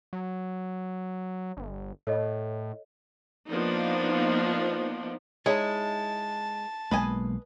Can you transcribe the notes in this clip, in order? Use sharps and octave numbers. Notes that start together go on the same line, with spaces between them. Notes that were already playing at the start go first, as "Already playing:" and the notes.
F#3
G1
A2 A4 C#5 D#5
F3 A#3 B3 D4 D#4
G#3 D#4 E4 C#5 A5
B1 G#3 A#3 B4 D#5 G#5